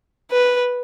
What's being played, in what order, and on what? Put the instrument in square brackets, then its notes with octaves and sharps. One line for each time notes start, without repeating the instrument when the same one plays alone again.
[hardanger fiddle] B4